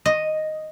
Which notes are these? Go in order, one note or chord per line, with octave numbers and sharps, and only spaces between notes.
D#5